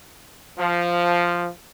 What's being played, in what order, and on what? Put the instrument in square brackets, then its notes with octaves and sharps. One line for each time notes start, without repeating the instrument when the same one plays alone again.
[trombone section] F3